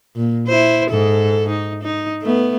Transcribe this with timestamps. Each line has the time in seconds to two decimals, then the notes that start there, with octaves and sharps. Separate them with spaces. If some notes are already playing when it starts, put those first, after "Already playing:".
0.16 A#2 A#3
0.47 E4 C5
0.90 G#2 A4
1.49 D#4
1.83 D#4
2.22 A3 B3